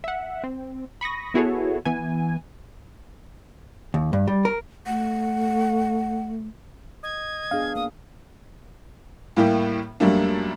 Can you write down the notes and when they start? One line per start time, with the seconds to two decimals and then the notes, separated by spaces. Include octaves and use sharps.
0.04 E5 F#5
0.44 C4
1.01 B5 C#6 D#6 A#6
1.34 B3 E4 F#4 G#4 A4 C#5
1.85 E3 B3 G#5
3.94 D#2
4.13 G2
4.28 G3
4.45 A#4
4.86 A3 F#5
7.04 D#5 G#6
7.51 B3 D4 G#4 F5
7.76 A#3 D#6
9.37 A2 G3 A#3 E4 G4
10.00 F#2 G3 A3 A#3 D4